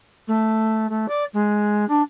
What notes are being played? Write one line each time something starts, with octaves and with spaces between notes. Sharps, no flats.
A3
A3
D5
G#3
D4